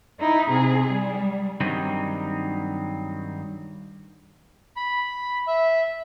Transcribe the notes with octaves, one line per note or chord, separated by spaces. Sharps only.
D#4 E4
C3 G#4
G3
G2 D#3 F#3 G3 C4 D#4
B5
E5